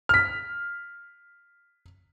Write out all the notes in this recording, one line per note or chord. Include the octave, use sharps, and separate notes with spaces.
F6 B6